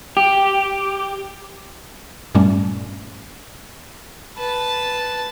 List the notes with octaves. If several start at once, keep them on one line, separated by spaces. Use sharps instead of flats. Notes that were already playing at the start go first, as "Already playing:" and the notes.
G4
G2 A#2 G3 A3 C#4
B4 A5